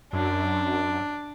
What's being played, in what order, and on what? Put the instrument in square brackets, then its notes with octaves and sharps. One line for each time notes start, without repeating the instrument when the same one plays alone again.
[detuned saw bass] F#2 [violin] D4